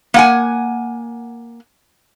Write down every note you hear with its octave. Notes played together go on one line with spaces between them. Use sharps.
A#3 F#5 G#5